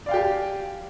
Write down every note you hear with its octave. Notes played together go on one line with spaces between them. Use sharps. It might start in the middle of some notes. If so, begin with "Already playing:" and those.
G4 D5 F5 G5 G#5